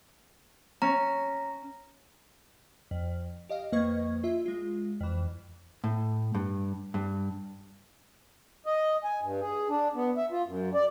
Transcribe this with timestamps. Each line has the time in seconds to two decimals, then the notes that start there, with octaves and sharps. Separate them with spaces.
0.82 C#4 A#5
2.91 F2
3.49 G4 D#5 F5
3.72 F2 A#3 B4 D#5 C#6 G#6
4.24 F4 E5
4.46 G#3 F4
5.01 F2 E3
5.84 A2
6.34 G2
6.94 G2
8.66 D#5
9.04 G#5
9.21 G2
9.41 G#4
9.69 D4
9.95 B3
10.17 E5
10.31 F4
10.46 F#2
10.74 D5